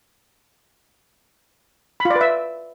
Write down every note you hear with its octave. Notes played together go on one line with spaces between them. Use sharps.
B5
F4
D5
B4
E5